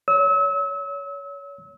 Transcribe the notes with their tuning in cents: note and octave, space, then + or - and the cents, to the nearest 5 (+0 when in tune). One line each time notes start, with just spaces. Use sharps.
C#5 +25 E6 -35